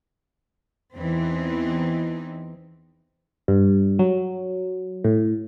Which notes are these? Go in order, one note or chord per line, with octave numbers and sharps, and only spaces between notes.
E2 E3 C4 D#4
G2
F#3
A2